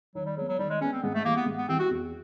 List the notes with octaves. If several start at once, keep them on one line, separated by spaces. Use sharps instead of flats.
D#3 F#3
G3
F#3 G#3 B3
F#3
D#3 G3
G#3
G#3 B3 C#4
C4
G#2 B3
A3
E3 G3 A#3
B3
G#2
B3
E3 G3 C4
F#4
E2